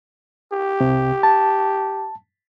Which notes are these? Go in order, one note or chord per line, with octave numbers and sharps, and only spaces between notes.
G4
C2 C3
A5